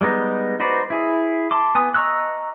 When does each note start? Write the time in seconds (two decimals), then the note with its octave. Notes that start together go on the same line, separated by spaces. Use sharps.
0.01 G3 G#3 B3 D#4
0.60 D#4 F#4 B4 C5 D5
0.90 E4 G#4
1.51 A5 C6 D6
1.75 B3 G#5 D#6
1.94 D#5 A#5 C#6 E6 F#6